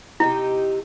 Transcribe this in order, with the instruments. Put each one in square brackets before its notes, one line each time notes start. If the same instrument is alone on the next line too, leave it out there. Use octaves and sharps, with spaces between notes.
[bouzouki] C3 D#4 G4 [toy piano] E4